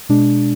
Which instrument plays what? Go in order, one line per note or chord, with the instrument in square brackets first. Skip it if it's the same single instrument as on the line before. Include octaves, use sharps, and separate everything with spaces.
[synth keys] B2 G#3 D4